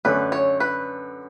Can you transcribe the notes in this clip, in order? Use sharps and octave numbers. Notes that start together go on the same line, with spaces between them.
F#2 D3 A3 C#4 B4
C#5
B4